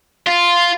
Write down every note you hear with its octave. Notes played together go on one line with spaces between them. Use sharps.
F4